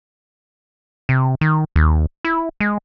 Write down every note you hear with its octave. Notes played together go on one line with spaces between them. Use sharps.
C3
D#3
D#2
E4
G#3